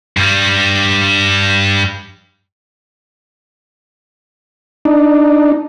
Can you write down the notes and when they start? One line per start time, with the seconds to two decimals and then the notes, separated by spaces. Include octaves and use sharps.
0.17 G2 G3
4.85 D4 D#4